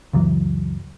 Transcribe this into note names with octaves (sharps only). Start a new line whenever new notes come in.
C#2 F#2 E3 F#3